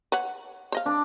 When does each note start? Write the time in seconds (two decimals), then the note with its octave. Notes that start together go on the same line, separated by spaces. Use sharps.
0.12 B4 C#5 F#5
0.72 C5 D#5 F5
0.86 D4